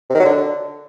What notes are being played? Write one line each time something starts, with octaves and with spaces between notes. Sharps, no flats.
C3
D#3
F#3
D3